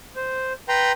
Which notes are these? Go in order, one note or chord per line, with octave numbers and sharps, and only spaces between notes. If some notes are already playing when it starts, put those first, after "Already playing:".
C5
B4 G5 A#5 C6